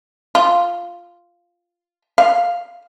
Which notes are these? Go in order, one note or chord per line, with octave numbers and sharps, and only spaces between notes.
F4
F5